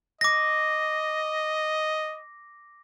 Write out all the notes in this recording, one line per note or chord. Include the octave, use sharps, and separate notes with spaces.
D#5 D6 A#6